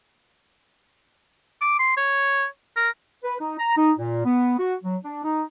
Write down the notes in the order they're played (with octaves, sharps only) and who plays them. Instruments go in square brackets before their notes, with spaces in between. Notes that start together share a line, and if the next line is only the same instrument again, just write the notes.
[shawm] D6
C6
C#5
A#4
[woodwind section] B4
D#4
A#5
D#4
A#2
B3
F#4
F#3
D4
D#4